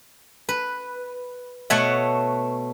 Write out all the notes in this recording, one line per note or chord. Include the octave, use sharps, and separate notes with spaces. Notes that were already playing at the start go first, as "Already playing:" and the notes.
B4
B2 A3 A4 C#5 E5 F#5